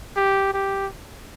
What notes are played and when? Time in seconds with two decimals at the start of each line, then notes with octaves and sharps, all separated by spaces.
0.17 G4
0.54 G4